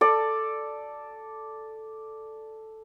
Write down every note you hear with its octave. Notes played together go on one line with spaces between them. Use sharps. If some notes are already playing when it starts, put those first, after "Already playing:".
A4 D5